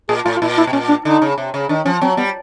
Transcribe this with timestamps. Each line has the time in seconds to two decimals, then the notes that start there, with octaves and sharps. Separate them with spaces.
0.09 A#2 G#4
0.25 A2 F4
0.37 F4
0.42 A#2 E4
0.58 E4
0.67 B2
0.73 A#2 C#4
0.89 D4
1.05 D3 D#4
1.22 C#3
1.38 C3
1.54 C#3
1.69 D#3 D4
1.85 F3 C#4
2.01 F#3 C4
2.17 G3 B3